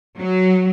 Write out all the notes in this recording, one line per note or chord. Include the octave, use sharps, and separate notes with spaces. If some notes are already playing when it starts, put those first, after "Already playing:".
F#3